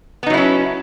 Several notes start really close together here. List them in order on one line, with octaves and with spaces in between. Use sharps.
B3 D#4 F#3 E4 C#4